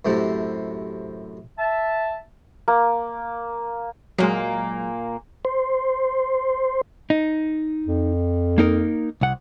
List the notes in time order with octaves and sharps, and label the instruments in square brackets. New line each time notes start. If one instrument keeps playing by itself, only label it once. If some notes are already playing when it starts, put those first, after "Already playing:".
[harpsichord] F#2 A2 C3
[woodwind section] E5 A5
[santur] A#3
[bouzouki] A#2 A#3 [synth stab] F#3 G#3
[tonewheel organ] C5
[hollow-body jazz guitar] D#4
[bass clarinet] F2
[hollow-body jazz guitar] A#3 D#4 A#4
C2 F#5